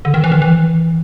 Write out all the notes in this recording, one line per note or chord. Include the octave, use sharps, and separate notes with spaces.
D3
D#3
E3
D#3
E3